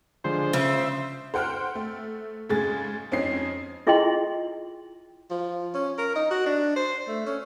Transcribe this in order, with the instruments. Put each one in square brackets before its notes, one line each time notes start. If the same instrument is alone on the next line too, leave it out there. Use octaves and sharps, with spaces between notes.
[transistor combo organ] D3 F3 G#3 [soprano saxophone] C5
[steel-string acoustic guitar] C#3 [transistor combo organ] E5
[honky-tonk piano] C5 F#5 G5 F6 F#6
A3
G#2 C#3 G#4 A6
F2 C4 C#4 D#4 C7
[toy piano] E4 F4 G#4 D#5 G5 C6
[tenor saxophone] F3
C#4
A#4
D#4
F#4
D4
C5
A3
C#4